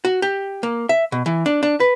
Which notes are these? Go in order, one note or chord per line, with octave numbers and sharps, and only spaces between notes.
F#4
G4
A#3
E5
B2
E3
D4
D4
B4